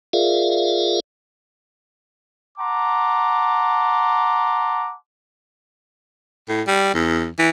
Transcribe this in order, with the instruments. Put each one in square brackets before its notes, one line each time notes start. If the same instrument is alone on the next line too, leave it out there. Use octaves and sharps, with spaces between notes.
[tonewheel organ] F4 G#4 A#4 D5 E5 F5
[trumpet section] F#5 A5 A#5 C6 D6
[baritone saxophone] A2
G3
E2
E3